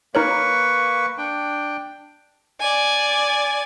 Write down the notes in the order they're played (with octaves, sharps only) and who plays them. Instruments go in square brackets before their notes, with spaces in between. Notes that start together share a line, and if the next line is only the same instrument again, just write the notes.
[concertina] A#3 B4 C#6 [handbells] D#4 A#4 C#5
[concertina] D4 G5
[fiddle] D5 G#5